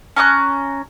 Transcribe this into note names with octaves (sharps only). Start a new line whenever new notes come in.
C#4 A#5 D#6 F#6